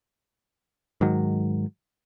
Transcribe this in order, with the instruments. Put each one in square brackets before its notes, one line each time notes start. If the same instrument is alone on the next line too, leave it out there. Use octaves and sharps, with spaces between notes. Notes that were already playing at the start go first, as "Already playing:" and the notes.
[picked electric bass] G#2 D#3 F#3